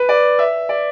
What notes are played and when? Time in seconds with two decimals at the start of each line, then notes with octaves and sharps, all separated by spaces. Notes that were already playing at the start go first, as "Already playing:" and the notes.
Already playing: B4
0.09 D5
0.39 E5
0.69 D5